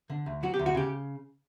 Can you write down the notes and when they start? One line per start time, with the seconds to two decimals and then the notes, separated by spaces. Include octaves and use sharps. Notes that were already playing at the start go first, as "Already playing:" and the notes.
0.10 D3
0.26 D2
0.43 F#3 F#4
0.54 G4
0.59 D2
0.66 F#4
0.75 C#3 G4